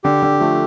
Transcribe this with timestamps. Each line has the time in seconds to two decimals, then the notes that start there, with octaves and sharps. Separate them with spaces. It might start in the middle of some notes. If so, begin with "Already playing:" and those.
0.04 D3 G4
0.22 D3
0.40 F3 A3